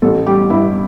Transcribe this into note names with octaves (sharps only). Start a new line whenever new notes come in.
A1 A4
G3 G4
G2 E4